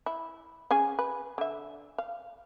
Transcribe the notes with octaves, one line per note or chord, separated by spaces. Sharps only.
E4
C#4 G#4 G#5
B4
D3 E5
F5